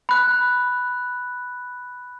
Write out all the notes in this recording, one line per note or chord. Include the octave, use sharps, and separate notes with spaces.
B5 F#6